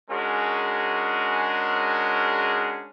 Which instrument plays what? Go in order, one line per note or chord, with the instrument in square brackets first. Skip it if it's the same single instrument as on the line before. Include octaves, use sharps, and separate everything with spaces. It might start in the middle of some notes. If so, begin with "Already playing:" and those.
[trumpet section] G#3 C#4 D4 F#4 G#4 A#4